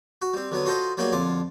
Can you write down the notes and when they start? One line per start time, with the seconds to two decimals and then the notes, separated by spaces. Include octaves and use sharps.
0.22 F#4
0.34 G3 C4
0.51 D3 F#3 B3 D#6
0.66 F4 F#4 A4 C5 D#5
0.97 F#3 G3 A#3 B3 F#4 G#4
1.12 F2 D3 F4 D6